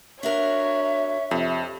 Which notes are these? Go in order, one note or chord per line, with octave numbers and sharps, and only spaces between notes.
D4 F#4 A#4 C#5 E5
F2 C3